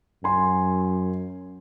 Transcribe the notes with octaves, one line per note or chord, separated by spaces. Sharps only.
F#2 G#5 C6